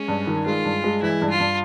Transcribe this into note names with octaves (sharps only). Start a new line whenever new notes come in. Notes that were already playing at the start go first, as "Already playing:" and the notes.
Already playing: G#3 C#4
G2
D#3
G#3 F4
G2
G#3
E3 E4
G2
F4
G2